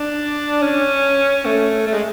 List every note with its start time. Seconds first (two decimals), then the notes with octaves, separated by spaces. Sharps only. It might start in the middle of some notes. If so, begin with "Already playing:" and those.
Already playing: D4
0.62 C#4
1.45 A3
1.87 A3
1.94 G#3